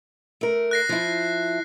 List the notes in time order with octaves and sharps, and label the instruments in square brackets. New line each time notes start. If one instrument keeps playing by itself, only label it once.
[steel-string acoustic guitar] A3 A#4
[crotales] F#6 A#6 C7
[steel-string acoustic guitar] F3 E4